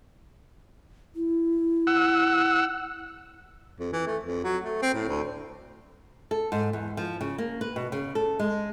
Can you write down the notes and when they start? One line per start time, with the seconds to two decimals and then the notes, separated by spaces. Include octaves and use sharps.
1.16 E4
1.87 F#5 E6
3.79 F2
3.93 E3
4.07 A3
4.23 F2
4.44 F#3
4.64 A3
4.82 C4
4.94 A2
5.08 D2
6.31 A4
6.52 G#2
6.73 E2
6.97 F3
7.21 C#3
7.38 A#3
7.61 B4
7.76 B2
7.92 C#3
8.15 A4
8.39 G#3